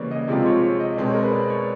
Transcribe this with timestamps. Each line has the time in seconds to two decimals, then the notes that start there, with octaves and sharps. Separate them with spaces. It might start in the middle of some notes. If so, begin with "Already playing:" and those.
Already playing: C#3 E3 G3 A#3 C#5 D5
0.11 D#5
0.28 C3 F3 G#3 C4 F4
0.46 C#5
0.63 C#5
0.80 D#5
0.97 B2 G#3 C4 D5
1.05 C#5
1.15 A#4
1.23 B4
1.32 D5
1.50 C#5